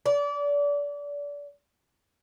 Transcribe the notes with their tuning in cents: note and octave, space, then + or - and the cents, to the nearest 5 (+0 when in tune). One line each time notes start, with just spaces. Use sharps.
D5 -30